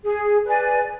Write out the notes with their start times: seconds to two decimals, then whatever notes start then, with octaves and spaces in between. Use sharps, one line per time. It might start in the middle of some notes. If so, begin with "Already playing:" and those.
0.04 G#4
0.46 B4 D5 G#5